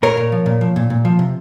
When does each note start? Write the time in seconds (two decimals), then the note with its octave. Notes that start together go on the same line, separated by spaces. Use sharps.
0.03 A#2 A#4 C#5
0.17 A#2
0.32 F3
0.46 A#2
0.61 F3
0.76 A#2
0.90 A#2
1.05 F3
1.19 C3